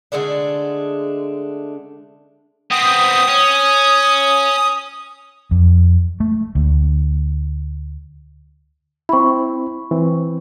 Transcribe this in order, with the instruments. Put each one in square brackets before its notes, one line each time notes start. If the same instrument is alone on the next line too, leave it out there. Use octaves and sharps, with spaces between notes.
[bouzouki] D3 G#3 A3 D4
[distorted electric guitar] B3 C4 [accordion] D#6
[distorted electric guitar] C#4
[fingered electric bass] F2
A3
D2
[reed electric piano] C4 E4 [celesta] B5 C#6
[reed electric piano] E3 C4